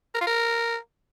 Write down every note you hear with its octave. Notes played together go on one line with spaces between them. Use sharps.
A#4
F4
A#4